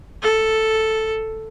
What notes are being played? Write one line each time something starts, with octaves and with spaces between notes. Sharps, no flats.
A4